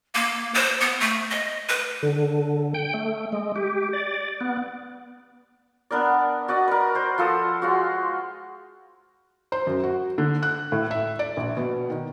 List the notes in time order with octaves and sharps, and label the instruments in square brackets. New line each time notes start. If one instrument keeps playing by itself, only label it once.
[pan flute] A#3
C5
B3
A3
D#5
B4
[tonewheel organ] D3
G5
A3
G#3
G4
D5
B3
[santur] B3 D4 A#4 D5
F#4 D5 D#5
A#4 B4
B4 C5
F3 F4 A4 D#6
G#3 F4 F#4
[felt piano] C5
F#2
F#4
D3
F#6
A2
E5
D5
A#1
B2
D#3